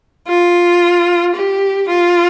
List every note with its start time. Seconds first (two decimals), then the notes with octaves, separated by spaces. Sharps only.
0.28 F4
1.35 G4
1.88 F4